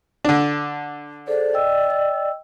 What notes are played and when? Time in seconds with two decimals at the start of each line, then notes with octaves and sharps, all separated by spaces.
0.25 D3 D4
1.27 G#4 A4 C5 D5
1.53 D#5 G5 E6